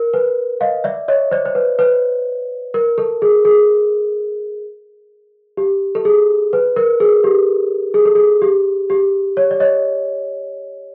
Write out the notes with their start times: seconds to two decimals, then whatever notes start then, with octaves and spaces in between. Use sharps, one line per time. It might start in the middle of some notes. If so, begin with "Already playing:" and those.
Already playing: A#4
0.14 B4
0.61 D#5 F5
0.84 D5 E5
1.08 C#5 D#5
1.31 C5 D5
1.45 C5
1.55 B4
1.79 B4
2.74 A#4
2.98 A4
3.22 G#4
3.45 G#4
5.57 G4
5.95 A4
6.05 G#4
6.53 B4
6.76 A#4
7.00 G#4
7.24 G4
7.94 G#4
8.05 A4
8.15 G#4
8.42 G4
8.90 G4
9.37 C#5
9.51 D5
9.60 C#5 D#5